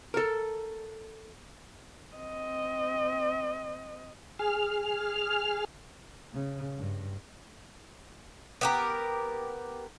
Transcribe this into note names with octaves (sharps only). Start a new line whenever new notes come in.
A4 A#4
C4 D#5
G#4 F6
C#3
G2
B3 G4 A#4